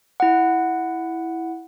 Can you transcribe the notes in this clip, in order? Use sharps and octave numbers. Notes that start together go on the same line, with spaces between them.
E4 F#5